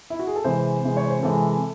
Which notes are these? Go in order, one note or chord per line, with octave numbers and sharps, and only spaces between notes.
E4
F#4
G#4
A4
C3 E3 G#3 C5
C3 E3 G#3
C#5
C5
C3 E3 G#3 A4